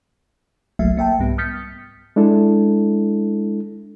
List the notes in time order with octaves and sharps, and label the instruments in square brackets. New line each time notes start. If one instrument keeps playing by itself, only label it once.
[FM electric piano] G1 C2 F#3 A3 A#3 E5
A#3 E5 G5 A5
C2 G#2 G3 B3
D#6 F6 G6 A6 B6 C#7
[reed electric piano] G#3 D4 E4 A4